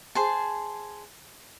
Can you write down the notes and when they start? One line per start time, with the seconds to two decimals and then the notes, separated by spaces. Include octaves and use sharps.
0.15 G#4 C5 A5